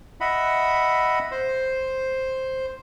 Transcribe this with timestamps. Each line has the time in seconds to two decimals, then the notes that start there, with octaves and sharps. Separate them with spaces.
0.21 D#5 E5 F#5 B5
1.32 C5